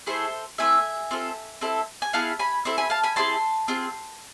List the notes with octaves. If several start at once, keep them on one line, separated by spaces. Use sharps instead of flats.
A3 E4 G#4 A4 C5
A3 C4 E4 E5 G#5
C4 F4 A4
C4 E4 A4
G#5
B3 E4 G#4 F5 A5
G#5 B5
C4 E4 A4
G#5 B5
F5 A5
G#5 B5
C4 E4 G#4 A5 C6
C4 F4 G#4